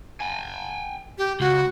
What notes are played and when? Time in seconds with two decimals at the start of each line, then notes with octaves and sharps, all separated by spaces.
0.20 G5 G#5
1.18 G4
1.40 C#2 F#4